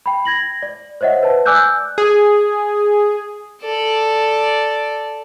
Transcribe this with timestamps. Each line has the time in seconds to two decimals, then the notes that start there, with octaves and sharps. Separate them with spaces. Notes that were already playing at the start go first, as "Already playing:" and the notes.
0.06 G5 B5
0.25 G#6 A#6 F#7
0.62 D5
1.01 C5 C#5 D#5 E5 F#5
1.22 B4 A5
1.46 D5 G#5 D6 E6 F#6 G6
1.98 G#4
3.62 A4 D5